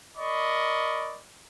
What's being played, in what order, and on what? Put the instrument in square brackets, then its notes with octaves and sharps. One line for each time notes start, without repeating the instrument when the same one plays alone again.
[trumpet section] A#4 D5 D#5 B5 C#6